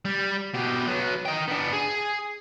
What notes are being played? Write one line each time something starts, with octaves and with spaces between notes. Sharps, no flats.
G3
B2 G4
F#3 B3
D#4 G5
B3 D4
G#4